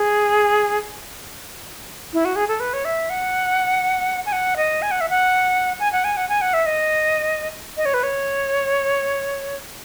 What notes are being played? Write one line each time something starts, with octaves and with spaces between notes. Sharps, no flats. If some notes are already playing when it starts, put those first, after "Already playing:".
Already playing: G#4
E4
F#4
G#4
A4
B4
C#5
E5
F#5
G#5
F#5
D#5
G#5
F#5
E5
F#5
G#5
F#5
G#5
F#5
G#5
F#5
E5
D#5
D#5
C#5
B4
C#5